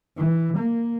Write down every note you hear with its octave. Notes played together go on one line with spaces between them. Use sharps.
E3
A#3